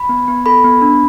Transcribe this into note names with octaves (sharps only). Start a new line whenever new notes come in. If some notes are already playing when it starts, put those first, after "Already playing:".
Already playing: B5
B3
B3
A4 B5
B3
D4